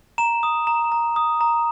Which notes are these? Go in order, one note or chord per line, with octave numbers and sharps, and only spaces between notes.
A#5 E7
D#6
A#5
A#5
D#6
A#5